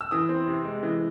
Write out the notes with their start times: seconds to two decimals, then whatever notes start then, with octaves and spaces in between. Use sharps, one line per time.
0.01 E6
0.11 E3 D#6
0.29 C4
0.47 C3
0.64 G#3
0.83 E3